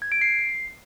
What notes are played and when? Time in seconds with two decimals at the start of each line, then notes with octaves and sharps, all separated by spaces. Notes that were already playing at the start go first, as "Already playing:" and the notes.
0.02 G#6
0.12 D7
0.21 C7